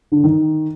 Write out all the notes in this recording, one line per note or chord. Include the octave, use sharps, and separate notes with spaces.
D3
D#3